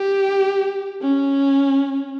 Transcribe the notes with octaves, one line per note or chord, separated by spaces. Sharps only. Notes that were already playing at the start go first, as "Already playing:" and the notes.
Already playing: G4
C#4